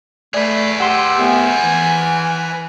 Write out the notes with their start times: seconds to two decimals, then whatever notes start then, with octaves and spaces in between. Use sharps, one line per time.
0.34 A3 G#4 B4 D5
0.80 G4 F#5 C6 E6
1.19 C2 A3 B3 G#5
1.61 E3